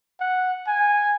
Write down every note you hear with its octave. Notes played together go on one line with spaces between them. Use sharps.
F#5
G#5